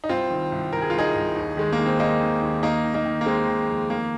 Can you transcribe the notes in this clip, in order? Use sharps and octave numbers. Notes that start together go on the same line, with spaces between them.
D#4
C2 C4 F4
D#3
C2
C2 A#4
G#4
C2 F4
D#4 G#4
C2
D#2
D#3 G#3
A#3
D#3
C4
D#3 A#3 D#4
D#3
D#2
D#3 A#3 D#4
D#3
A#3 D#4
D#3
A#3
D#3 G#3 C4
D#3
F2
D#3 A#3